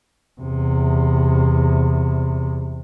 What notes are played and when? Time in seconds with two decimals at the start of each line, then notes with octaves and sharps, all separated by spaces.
0.41 E2 C3